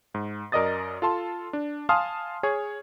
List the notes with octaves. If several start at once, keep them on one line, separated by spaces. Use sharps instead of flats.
G#2
F#2 A#4 D5 D#5 D#6 A6
F4 A4 A5 C6
D4
F5 G#5 A5 C6 D#6 F6
G#4 C#5 G#6